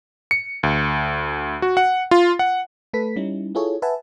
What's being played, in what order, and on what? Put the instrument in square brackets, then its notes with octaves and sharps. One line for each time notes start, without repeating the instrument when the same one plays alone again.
[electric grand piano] C#7
D2
F#4
F#5
F4
F#5
[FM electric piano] A3 A4 B4 B6
G3 C#4 D#4 E4
E4 F4 G#4 A4 C#5
B4 E5 F#5 G#5 A5